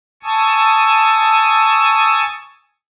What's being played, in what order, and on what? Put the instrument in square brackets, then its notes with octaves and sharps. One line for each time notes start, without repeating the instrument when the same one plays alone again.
[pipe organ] G#5 A5 C#6 D#6 E6